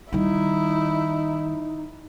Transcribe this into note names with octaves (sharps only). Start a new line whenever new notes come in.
D#3 G3 D#4 E4